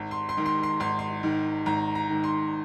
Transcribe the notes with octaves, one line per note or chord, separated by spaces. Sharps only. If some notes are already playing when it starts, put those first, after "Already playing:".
Already playing: G#1
C6
C6
G#2 D#3
C6
C6
G#1 C6
C6
G#2 D#3
G#1 A#5
A#5
G#2 D#3
C6